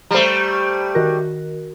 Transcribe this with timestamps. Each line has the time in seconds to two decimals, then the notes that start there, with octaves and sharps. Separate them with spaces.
0.11 G3 A3 C5 A#5
0.95 D#3 F#4 A#4